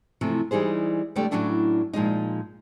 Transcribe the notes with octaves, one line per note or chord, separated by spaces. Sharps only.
C3 E3 F3 A3
E3 G3 D#4 G#4 C5
F2 D3 G3 A3 D5 G5
A2 F#3 A3 C#4 D4 E4
A#2 F3 G#3 D#4